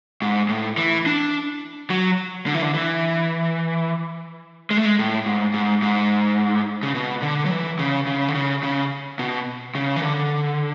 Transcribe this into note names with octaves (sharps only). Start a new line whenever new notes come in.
G#2
A2
E3
D4
F#3
D3
E3
D3
E3
G#3
A3
G#3
A2
G#2
G#2
G#2
C#3
B2
D3
F#3
E3
C#3
C#3
D3
C#3
C#3
B2
C#3
E3
D3